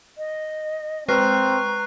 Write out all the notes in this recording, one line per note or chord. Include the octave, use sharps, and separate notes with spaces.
D#5
G#3 C4 B4 A#5 C#6 F6 F#6 C7